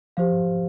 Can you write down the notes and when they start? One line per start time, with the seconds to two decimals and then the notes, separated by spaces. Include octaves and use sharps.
0.17 F3 G4 C5 F5